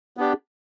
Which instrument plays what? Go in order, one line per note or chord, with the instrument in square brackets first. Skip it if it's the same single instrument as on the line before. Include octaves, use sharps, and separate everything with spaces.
[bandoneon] B3 D4 G4